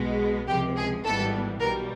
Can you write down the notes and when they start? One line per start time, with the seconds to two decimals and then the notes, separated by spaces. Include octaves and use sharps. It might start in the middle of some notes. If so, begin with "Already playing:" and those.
Already playing: B1 B2 G#3 B3
0.48 C#2 C3 F3 G#3 G4
0.76 G#4
1.04 G#1 G#2 E3 G3 B3 A4
1.60 B1 B2 G3 A#4